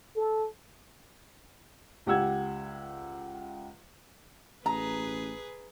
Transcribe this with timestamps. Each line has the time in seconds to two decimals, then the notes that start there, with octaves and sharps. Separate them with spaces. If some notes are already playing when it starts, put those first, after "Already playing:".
0.16 A4
2.06 C#2 G4 F#5 E6 G#6
4.66 A1 G#4 B4 A#5